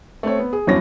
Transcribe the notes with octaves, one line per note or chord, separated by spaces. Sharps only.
A3 C4 C#5
B3
G#4
G1 E2 F#3 C#4 A#6